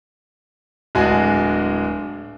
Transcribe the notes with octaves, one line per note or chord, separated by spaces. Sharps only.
D1 G#3 D4 F#4 G#5